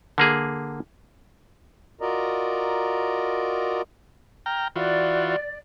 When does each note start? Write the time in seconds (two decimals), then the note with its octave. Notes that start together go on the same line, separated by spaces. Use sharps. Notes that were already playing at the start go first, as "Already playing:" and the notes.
0.18 D3 A#3 G#4
2.01 F4 F#4 A#4 D5 D#5 A#5
4.46 G5 A#5 F6
4.76 E3 F4 F#4 D5